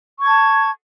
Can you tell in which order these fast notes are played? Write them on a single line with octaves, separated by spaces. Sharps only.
C#6 G#6 A5